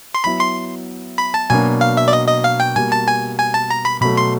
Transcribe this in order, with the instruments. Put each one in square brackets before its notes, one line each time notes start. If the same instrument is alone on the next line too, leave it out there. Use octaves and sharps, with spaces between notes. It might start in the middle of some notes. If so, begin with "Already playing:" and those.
[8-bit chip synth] C6
[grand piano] F#3 B3 E4 [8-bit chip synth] B5
[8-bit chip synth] C6
B5
A5
[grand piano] B2 F#3 A#3 D4 [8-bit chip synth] G#5
[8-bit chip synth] F5
E5
D5
D#5
D#5
F5
G5
[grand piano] B2 G3 A#3 [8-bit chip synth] G#5
[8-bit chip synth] A5
G#5
G#5
A5
A#5
B5
[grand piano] B2 F#3 A3 [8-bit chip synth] B5
[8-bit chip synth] C6